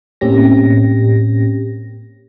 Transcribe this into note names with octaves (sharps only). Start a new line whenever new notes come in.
A2 A#3 C4 C#4 G4 A#6